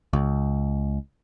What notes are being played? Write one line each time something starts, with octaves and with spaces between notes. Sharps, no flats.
C#2